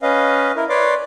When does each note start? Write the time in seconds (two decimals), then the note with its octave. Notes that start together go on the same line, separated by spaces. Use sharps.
0.02 C#4 B4 D#5 F5
0.56 E4 A#4
0.69 B4 C#5 D5 C6 D6